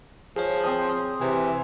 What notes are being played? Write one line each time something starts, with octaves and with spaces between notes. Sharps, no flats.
F3 G#4 C#5
C4 C6 D#6
C3 E3